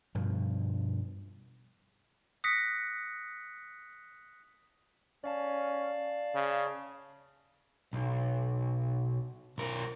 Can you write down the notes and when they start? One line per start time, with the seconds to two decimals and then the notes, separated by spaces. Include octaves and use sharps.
0.15 G2 B2 F3
2.44 D#6 F#6 A#6 B6 C#7
5.24 C#4 D5 F5 A5
6.35 C#3
7.93 B1
9.58 B1 A#4